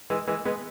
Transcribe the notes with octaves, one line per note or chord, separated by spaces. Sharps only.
E3 G#3
E3 G#3
G#3 B3